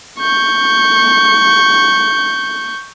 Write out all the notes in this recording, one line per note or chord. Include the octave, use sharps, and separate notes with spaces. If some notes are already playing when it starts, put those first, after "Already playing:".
C#6 G6